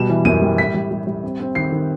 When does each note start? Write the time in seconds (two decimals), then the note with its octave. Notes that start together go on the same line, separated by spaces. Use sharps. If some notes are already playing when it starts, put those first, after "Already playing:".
Already playing: B2 G3 E7
0.09 E3
0.25 F#2 D#7
0.42 G3
0.58 A2 B6
0.74 G3
0.91 G3
1.07 G3
1.24 C4
1.40 C4
1.55 D#3 C7
1.72 D#3